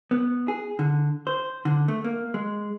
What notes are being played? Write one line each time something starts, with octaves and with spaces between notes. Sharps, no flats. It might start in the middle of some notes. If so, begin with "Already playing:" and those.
B3
G#4
D3
C5
D3
A3
A#3
G#3